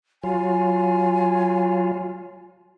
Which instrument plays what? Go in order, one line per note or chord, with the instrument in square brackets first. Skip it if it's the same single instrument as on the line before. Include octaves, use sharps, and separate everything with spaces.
[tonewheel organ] F#3 F4 [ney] G#5